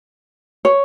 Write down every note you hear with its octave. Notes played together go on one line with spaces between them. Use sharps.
C#5